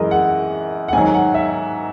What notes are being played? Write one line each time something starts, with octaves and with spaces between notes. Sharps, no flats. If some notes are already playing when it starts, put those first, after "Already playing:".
Already playing: F#2 E3 G#3 A#4 D#5
F#5
F#5
G#2 D#3 F#3 G#5
F#5
E5